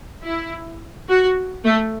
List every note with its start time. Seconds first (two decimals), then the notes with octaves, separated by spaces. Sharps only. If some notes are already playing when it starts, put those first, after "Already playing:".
0.24 E4
1.09 F#4
1.65 A3